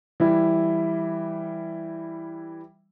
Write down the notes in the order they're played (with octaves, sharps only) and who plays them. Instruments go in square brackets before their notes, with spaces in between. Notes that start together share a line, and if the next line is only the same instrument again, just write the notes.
[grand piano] E3 G3 E4